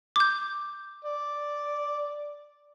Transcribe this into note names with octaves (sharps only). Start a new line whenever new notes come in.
D6 G6
D5